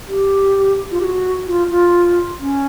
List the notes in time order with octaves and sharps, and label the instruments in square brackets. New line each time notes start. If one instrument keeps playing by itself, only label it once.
[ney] G4
F4
G4
F#4
F4
F4
C#4